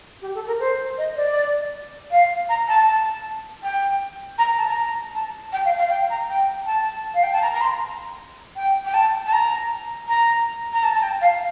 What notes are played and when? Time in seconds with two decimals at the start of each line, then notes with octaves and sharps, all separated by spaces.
0.22 G4
0.35 A4
0.47 A#4
0.60 C5
0.98 D#5
1.16 D5
2.11 F5
2.49 A#5
2.68 A5
3.63 G5
4.38 A#5
4.58 A5
4.68 A#5
5.15 A5
5.52 G5
5.65 F5
5.78 F5
5.90 G5
6.10 A#5
6.29 G5
6.66 A5
7.14 F5
7.23 G5
7.33 A5
7.42 A#5
7.54 A#5
7.61 C6
8.56 G5
8.85 G5
8.94 A5
9.26 A5
9.32 A#5
10.08 A#5
10.73 A#5
10.83 A5
10.94 A5
11.03 G5
11.21 F5